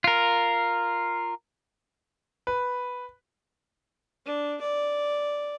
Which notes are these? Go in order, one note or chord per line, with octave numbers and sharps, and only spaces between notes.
F4 A#4
B4
D4
D5